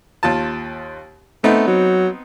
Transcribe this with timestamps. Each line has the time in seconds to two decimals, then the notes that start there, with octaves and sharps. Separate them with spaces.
0.23 D#2 F4 A5
1.44 A3 B3 C4 D#4
1.68 F#3